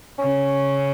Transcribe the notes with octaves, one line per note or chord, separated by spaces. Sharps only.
C#3 C#4